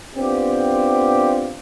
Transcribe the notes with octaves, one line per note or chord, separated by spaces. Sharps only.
B3 C4 D4 F4 G4